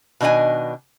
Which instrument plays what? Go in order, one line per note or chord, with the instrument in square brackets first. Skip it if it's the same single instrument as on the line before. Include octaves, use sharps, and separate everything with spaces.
[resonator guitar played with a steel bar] B2 D#3 D4 D#5 G#5